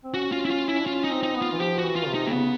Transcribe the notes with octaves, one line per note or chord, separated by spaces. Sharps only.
C4
C#4 F#4
F4
E4
F4
E4
D4
C#4 F4
D#4
C4
D#4
B3
F4
E3
F3 G4
F#4
E3
F4
C3
D#4
A#3
C#3 B3